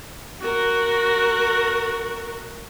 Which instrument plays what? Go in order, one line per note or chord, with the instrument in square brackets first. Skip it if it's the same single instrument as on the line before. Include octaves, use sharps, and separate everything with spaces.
[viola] F#4 A#4